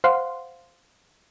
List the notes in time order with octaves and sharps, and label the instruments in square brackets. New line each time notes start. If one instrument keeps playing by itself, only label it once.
[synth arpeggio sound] C5 F5 F#5 C6